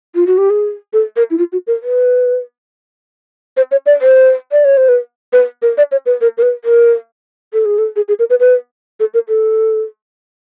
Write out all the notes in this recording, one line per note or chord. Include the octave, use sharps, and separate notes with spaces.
F4
F#4
G4
G#4
A4
A#4
E4
F4
F#4
A#4
B4
C5
C#5
D5
C5
D5
C#5
C5
B4
B4
A#4
D5
C#5
B4
A#4
A#4
B4
A#4
A4
G#4
A4
G#4
G#4
A#4
B4
B4
A4
A#4
A4